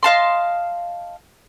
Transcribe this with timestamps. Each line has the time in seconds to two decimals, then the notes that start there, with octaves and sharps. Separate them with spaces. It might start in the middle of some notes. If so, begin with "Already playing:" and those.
0.03 D#5 F5 A5 C6